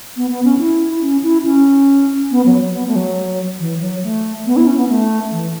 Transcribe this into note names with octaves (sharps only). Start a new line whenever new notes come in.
B3
B3
C#4
E4
C#4
E4
C#4
B3
F#3
F#3
B3
A3
F#3
E3
F#3
A3
B3
E4
C#4
B3
A3
E3